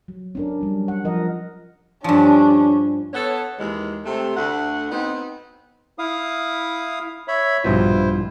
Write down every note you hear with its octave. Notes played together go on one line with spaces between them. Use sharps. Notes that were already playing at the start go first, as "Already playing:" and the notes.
F#3
C#4 D4 A#4
F#3 G3
F#5
F3 A#4 D#5
G2 F3 C#4 D4
B3 A4 C#5
D#2 E3 G#3
C3 A3
D2 F#5
B3 C4 D#4
E4 F5 D#6
C#5 E5 B5
A#1 G2 B2 E4 F4 C5